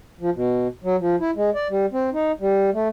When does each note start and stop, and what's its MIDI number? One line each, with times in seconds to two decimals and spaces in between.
0.20 0.30 53
0.34 0.68 47
0.84 0.96 54
1.00 1.16 53
1.20 1.31 64
1.36 1.50 56
1.55 1.68 74
1.70 1.86 55
1.92 2.10 60
2.13 2.32 63
2.40 2.70 55
2.74 2.88 57